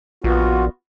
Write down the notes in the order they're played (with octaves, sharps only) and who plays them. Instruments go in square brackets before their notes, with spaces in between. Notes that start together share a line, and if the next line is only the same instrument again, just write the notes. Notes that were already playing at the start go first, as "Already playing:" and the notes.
[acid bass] A#1 [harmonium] B3 F4 F#4